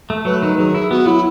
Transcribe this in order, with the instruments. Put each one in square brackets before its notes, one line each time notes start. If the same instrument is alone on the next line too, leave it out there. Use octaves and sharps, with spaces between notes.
[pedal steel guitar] A3
[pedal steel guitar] F#3 [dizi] B4
[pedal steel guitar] D#3
[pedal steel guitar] F#3 [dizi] G#4
[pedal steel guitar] E4
[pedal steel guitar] B3 [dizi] F#4
[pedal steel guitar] F#3 [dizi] E4